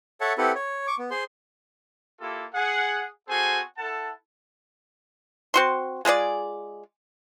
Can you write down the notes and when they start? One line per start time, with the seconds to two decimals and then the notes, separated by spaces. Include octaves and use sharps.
0.21 A4 C#5 E5 F#5 A5
0.38 C4 E4 G4 A4 B4 F#5
0.55 C#5
0.87 C#6 D6
0.99 B3
1.11 G#4 C5 C6
2.20 A#3 E4 F4 G4 A4
2.54 G#4 F#5
3.28 C4 F#4 G#4 A4 C5 G#5
3.78 E4 A4 F#5 A5
5.54 C4 F#4 C6
6.05 G#3 F4 G#4 D5